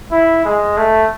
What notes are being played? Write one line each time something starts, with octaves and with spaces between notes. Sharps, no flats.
E4
G#3
A3